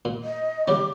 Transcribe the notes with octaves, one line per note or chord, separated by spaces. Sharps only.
A#2
D#5
C#3 G3 C#4 D6